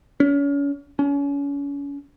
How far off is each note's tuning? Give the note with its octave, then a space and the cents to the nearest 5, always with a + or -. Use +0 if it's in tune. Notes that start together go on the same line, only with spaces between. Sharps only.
C#4 +35
C#4 +35